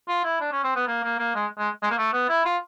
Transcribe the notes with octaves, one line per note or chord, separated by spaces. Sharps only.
F4
E4
D4
C#4
C4
B3
A#3
A#3
A#3
G#3
G#3
G#3
A#3
A3
B3
E4
F4